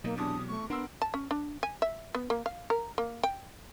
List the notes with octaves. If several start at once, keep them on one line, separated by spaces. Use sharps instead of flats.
B2 F#3 A#3 D#4
E2 C3 D4 D#6
A3 C#6
B3 D4 A#4 F#5 C6 E6
A5
C#4
D4
G#5
E5
B3
A#3
F5
A#4
A#3
G5